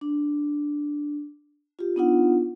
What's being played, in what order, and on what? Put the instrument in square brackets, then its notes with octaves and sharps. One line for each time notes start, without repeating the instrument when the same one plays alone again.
[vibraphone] D4
F4 G4
B3 D4 D#4 F4 F#5